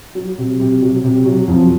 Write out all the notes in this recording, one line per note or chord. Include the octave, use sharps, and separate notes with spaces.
F#3
C3
C3
F#3
C3
F#3
F2